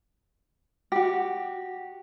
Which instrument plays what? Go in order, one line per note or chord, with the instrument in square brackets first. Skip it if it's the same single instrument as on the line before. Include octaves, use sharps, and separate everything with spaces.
[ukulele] F#4 G4